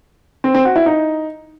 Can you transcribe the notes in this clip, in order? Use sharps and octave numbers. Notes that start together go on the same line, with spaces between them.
C4
C4
F#4
E4
D#4